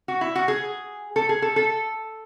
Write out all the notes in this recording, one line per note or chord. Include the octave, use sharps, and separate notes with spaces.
F#4
E4
F#4
G#4
A4
G#4
A4
A4